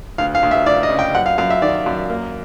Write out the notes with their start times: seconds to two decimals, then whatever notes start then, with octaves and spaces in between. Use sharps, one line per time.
0.18 D2 F5
0.35 F5
0.43 D2
0.51 E5
0.66 D2 D5
0.83 D#5
0.90 C#3
0.99 G5
1.15 F#2 F#5
1.26 F5
1.38 F#2 F5
1.50 E5
1.62 D#3 D5
1.86 F#2
2.10 A#3